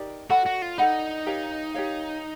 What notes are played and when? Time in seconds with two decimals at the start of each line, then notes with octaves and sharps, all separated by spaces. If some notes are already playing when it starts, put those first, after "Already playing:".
Already playing: D#4 G4 A#4 D5
0.30 F#4 A4 D5 F#5 B5
0.46 F#4
0.62 F4
0.78 D#4 A4 D5 F#5 B5
1.26 G4 A#4 C#5 F5
1.74 G4 A#4 C#5 F5